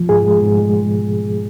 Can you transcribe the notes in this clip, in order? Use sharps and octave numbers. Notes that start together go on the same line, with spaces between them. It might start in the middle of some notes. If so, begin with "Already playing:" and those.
Already playing: F3
G#2 G#4
G#3
G#2
G#3